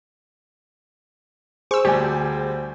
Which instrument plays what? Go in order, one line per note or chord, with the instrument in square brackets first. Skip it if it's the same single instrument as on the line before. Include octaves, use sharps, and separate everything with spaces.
[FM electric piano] G#4 C5 [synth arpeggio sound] C#6 E6
[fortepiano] D2 G3 G#5 [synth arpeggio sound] G4